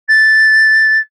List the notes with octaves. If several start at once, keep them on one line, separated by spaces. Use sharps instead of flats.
A6